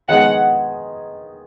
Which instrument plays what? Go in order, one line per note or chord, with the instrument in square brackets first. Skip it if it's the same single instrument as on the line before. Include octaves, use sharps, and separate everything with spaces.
[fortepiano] D#3 G#3 B3 D#4 G#4 [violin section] F#5